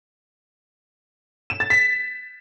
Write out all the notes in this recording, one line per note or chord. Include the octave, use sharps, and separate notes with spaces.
E7
A6
B6